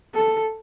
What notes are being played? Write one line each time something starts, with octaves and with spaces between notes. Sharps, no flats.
A4